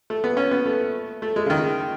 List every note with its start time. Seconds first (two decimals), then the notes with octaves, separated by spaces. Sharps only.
0.10 A3
0.24 B3
0.37 C#4
0.51 B3
0.66 A3
1.22 A3
1.36 G#3
1.46 C#3
1.50 D#3